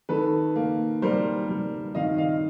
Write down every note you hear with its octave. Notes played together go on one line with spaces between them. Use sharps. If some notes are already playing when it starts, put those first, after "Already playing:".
D#3 A4 B4
A#3
G3 A#4 C5
G3
D#3 D#5 F5
D#5 F5